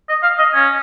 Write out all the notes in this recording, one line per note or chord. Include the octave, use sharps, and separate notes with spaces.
D#5
F5
D#5
C#4